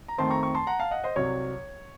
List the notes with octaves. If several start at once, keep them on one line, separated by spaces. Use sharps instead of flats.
A#5
F2 D#3 A3 C4 A5 C6
A#5 C#6
A#5 C#6
A5 C6
F#5 A#5
F5 A5
D#5 F#5
C5 D#5
C2 C3 F#3 C#5